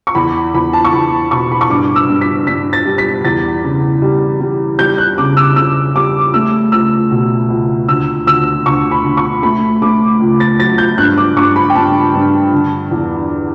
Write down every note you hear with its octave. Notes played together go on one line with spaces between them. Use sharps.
C#6
E2 B5
E2 B5
A5
C#6
E2 B5
B2 C#6
B5
C#6
G2 D6
E6
G2
B6
G2 B6
A6
G3
B6
E2 A6
C#3
G3
G3
G3 G6
F#6
C#3 D6
E6
C#3 E6
G3 D6
A3 E6
C#2 E6
B2
C#2
D2 E6
D2 E6
D2 C#6
B5
D2
C#6
A3 B5
A3 D6
C#2
A6
F#3 A6
G6
G2 F#6
D6
G2 C#6
B5
G5
G2 A5
G2
D3
E2